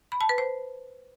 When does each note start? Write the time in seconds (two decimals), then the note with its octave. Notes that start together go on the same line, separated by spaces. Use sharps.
0.12 B5
0.21 A5
0.29 B4
0.38 C5